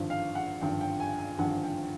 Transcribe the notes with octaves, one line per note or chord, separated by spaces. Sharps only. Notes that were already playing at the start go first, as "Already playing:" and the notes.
Already playing: G#1 G2 D3 F3
F5
F#5
G#1 G2 D3 F3 G5
G5
G#5
G#5
G#1 G2 D3 F3 F#5
G5